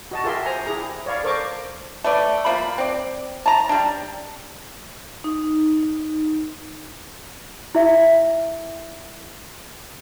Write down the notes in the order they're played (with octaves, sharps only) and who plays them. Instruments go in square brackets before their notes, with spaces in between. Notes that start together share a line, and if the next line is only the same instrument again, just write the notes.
[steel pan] F#4 D#5 A5
F4 G4 G#4 A#4 E5 C6
C5 G#5 A#5
E4 G4 G#4 A#5
C#5 D5 F5 B5
A4 A#4 C5 C#6 D6
[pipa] A3 B4 D5
F3 A#3 B5
C4 D5
A5 A#5
G3 D4
[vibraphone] D#4
[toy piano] E4 E5